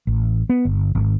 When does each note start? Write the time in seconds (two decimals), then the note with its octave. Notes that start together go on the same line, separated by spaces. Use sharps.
0.07 A1
0.50 B3
0.65 G1
0.95 G#1